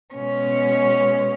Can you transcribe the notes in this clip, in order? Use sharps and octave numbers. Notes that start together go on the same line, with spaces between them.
B2 G#3 C#4